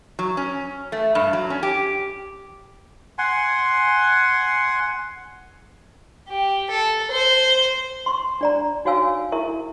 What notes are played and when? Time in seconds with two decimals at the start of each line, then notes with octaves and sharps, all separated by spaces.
0.19 F#3
0.37 C#4
0.92 A3
1.15 G2
1.33 F#3
1.50 C#4
1.63 G4
3.18 F#5 G#5 C6
6.28 G4
6.70 A4
7.11 C5
8.06 C6 C#6
8.41 D4 D5 A#5
8.85 D#4 F#4 C#5 F5 G#5 E6
9.32 E4 A#4 E5 C#6